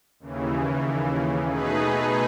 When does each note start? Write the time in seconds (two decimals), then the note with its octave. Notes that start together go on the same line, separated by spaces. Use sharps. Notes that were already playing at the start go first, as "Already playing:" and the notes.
0.20 D#2 C#3 E3
1.48 B2 A3 D#4 G#4 B4